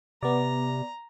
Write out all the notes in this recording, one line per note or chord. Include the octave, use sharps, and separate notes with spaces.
C3 B3 D5 A#5